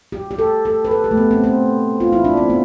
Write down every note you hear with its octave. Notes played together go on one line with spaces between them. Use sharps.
G4
G4
A4
A4
B4
A4
G4
A3
B3
C4
C4
F4
E4
D4
C4
B3